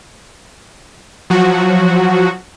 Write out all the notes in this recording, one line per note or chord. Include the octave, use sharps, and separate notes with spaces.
F3 F#3 F#4